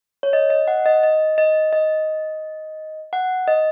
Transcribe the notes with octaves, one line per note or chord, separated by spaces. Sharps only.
C#5
D#5
D#5
F#5
D#5
D#5
D#5
D#5
F#5
D#5